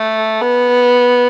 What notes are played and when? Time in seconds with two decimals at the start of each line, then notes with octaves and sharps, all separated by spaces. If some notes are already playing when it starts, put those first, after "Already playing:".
Already playing: A3
0.42 B3